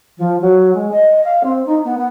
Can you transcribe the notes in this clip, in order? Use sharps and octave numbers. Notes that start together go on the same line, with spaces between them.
F3
F#3
G#3
D#5
F5
C4
D#4
B3
B3